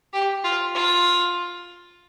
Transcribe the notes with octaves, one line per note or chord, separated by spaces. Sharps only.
G4
F4
F4